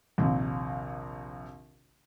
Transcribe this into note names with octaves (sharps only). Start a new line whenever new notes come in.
A#1 D#2 C3